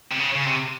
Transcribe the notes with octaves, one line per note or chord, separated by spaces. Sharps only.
C3
C#3
C#3
C3